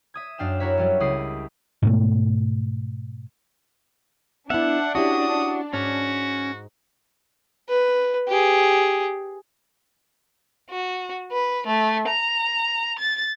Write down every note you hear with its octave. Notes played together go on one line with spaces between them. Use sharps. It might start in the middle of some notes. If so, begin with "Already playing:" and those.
E5 D#6 G#6
F#2 D4 F5 G5 E7
E4 F#4 A#4 C#5 E5
F#3 G3 C#4
C#2 E4 G4 D#6 C7
G#2 B2 A3
B3 D4 E4 E5 F#5
C#4 E4 F#4 G4 D#6
G#2 C#4 F#4
B4
G4 G#4
F#4
B4
A3
A#5
A6